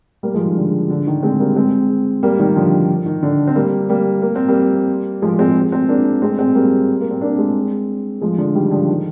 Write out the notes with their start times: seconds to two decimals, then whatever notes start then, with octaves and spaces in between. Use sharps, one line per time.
0.23 G3 A#3
0.34 F3 G#3
0.46 D#3
0.56 D3
0.89 D3
1.07 D#3
1.23 G#3 C4
1.40 G3 A#3
1.56 G#3 C4
2.23 G3 A#3
2.39 D#3 G3
2.56 D3 F3
3.06 D#3
3.23 D3
3.47 C4
3.56 G3 A#3
3.89 G3 A#3
4.22 A#3
4.36 C4
4.48 G3 A#3
5.22 F3 G#3
5.39 G#3 C4
5.72 G#3 C4
5.89 A#3 D4
6.22 G#3 C4
6.38 G#3 C4
6.55 G3 A#3
7.01 A#3
7.11 C4
7.21 A#3 D4
7.38 G#3 C4
8.21 F3 G#3
8.38 D3 F3
8.55 D#3 G3
8.71 D3 F3
8.88 D#3